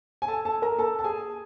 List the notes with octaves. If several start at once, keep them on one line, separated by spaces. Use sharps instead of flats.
G#5
A4 A5
A4 A5
A#4 A#5
A4 A5
A5
G#4 G#5